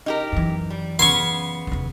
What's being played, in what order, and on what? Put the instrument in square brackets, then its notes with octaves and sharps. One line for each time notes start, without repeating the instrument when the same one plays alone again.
[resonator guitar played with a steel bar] D#4 G4 A#4
[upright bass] F#2 E3
[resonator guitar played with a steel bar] G3
[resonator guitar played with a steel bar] C#3 B3 [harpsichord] C6 C#6
[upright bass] F1 D#2